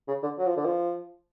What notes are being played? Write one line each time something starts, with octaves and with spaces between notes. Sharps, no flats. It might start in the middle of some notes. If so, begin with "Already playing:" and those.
C#3
D3
F#3
F3
D3
F3